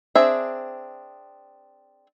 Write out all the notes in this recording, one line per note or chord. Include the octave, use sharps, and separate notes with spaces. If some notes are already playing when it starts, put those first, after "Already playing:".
C4 D4 G#4 E5